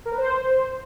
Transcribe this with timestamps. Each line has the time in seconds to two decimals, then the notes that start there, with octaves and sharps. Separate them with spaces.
0.06 A#4
0.12 B4
0.18 C5